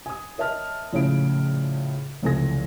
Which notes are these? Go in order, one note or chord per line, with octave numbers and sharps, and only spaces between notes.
G#5 D#6
A#4 C#5 D#5 E5 A5 F6
A#1 A2 C#3 E4 G#4 D7
F1 C#2 E3 A4 G#5 A#6